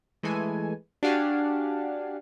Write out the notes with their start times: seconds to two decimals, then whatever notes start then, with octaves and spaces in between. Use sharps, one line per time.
0.23 E3 G#3 A3 A4 G#5
1.03 D4 F#4 G4 F5 F#5 G#5